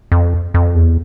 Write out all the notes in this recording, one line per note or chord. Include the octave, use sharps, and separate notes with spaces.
F2
F2
E2